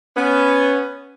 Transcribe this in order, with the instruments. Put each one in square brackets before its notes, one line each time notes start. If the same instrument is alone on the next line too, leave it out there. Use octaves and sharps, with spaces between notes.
[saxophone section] B3 C#4